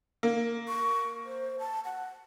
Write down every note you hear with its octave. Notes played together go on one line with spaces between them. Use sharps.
A#3
C#6
C5
A5
F#5